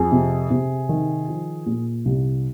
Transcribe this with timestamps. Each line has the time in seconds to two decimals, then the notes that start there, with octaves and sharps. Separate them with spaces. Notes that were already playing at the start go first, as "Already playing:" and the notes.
Already playing: F2 G#4
0.12 C3
0.50 C3
0.89 D#3
1.28 F3
1.66 A#2
2.05 C2